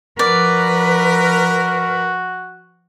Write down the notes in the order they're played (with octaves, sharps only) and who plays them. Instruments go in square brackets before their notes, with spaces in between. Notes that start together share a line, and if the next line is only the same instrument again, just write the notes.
[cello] F3 B4 [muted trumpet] F#4 [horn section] A#4 [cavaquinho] D5